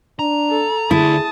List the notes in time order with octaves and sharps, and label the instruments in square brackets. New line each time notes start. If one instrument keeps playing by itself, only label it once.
[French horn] D4 [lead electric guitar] A#5
[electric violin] A4
[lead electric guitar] D2 [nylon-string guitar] E4 [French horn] G#4 [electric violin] A5 D#6